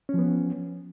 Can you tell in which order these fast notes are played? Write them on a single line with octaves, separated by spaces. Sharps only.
C#4 F3 B3